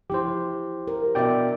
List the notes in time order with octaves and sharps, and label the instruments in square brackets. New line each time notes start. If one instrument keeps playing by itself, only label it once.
[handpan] F3 E4 [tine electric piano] G4 C5
[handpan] A#4
[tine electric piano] B2 D5 G5 [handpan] D4 E5